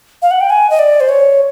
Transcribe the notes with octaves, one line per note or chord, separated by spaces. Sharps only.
F5
F#5
G5
G#5
D#5
D5
C5
C#5